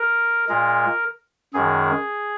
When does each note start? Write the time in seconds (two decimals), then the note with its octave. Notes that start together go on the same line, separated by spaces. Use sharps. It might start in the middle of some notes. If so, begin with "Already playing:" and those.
Already playing: A#4
0.49 A#2 G#3 A#4
1.54 F#2 D#3 G#3 G#4